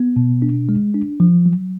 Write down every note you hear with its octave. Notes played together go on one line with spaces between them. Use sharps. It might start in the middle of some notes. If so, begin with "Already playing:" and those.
Already playing: B3
B2
D4
G#3
D4
F3
F#3